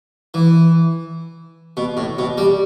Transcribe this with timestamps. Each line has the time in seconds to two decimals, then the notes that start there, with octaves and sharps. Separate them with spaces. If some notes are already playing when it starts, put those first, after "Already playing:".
0.34 E3
1.77 B2
1.97 A2
2.19 B2
2.38 G3